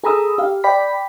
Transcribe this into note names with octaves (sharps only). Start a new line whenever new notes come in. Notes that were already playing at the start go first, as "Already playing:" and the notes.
G#4 A4 A#5 B5 D#6 E6
G4 F5
D5 G5 B5 B6